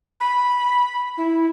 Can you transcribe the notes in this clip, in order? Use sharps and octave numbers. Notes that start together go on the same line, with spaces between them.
B5
E4